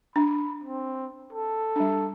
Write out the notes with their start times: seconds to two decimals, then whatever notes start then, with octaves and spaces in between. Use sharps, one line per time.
0.16 D4 B5
0.64 C4
1.33 A4
1.76 G3 D4